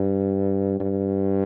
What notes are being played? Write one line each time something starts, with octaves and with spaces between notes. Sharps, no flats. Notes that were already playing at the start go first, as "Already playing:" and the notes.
Already playing: G2
G2